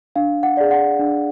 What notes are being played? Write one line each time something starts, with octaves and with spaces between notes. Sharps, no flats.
D4 F5
F#5
G#4 D5
F#5
D4